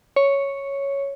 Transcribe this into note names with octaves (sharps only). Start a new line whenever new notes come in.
C#5